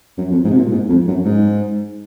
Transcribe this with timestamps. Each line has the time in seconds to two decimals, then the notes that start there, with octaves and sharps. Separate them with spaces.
0.18 F#2
0.31 F2
0.44 G#2
0.51 C3
0.58 A#2
0.71 G#2
0.89 F2
1.08 F#2
1.25 G#2